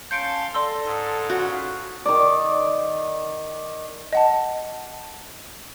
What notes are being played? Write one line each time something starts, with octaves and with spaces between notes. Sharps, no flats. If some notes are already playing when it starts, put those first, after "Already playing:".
C#4 F5 A5 C6 G6 C#7 D7
A4 D5 C6 E6 A#6
G#2
C#3 C#4 F4 F#4
D#3 D5
D#5 F#5 A5